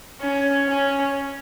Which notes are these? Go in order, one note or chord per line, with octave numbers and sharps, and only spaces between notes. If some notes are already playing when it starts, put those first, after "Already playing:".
C#4
C#4